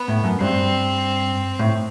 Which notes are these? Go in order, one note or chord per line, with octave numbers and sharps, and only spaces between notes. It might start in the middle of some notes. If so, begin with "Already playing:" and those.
Already playing: B3
A2
F#2
G2 C4
A2